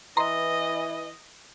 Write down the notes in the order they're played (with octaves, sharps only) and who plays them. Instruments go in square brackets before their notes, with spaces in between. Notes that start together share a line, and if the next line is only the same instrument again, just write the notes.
[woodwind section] E3 [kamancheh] D#5 [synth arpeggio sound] A#5 C6